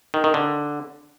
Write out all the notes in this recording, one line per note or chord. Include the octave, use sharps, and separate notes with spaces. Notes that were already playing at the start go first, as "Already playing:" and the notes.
D#3
D#3
D3